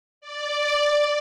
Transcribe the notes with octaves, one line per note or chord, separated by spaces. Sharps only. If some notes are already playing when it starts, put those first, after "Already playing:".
D5